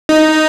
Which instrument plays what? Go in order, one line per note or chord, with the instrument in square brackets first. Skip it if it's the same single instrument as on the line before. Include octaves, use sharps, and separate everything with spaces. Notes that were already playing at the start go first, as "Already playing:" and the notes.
[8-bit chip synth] D#4